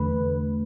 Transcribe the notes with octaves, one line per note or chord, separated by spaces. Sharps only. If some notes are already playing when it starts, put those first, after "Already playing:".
Already playing: E2 D3 A3 B4